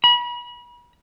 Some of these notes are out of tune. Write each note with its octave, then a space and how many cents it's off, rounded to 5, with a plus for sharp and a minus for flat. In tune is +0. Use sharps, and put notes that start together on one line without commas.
B5 -35